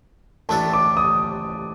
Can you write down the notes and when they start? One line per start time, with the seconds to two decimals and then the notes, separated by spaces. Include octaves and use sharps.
0.49 A1 A2 A3 D4 A4 A5
0.73 D6
0.97 D#6